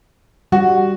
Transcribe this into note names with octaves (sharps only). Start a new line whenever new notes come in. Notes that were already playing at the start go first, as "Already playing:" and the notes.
G3 F#4